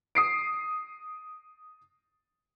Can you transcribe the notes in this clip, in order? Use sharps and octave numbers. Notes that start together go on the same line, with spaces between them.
D#6 C7 D7